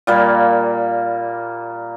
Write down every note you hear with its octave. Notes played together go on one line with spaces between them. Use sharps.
A#2 G3 A#3